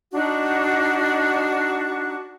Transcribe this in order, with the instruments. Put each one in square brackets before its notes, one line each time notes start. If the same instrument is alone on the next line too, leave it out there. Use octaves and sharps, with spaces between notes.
[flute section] D4 D#4 F#4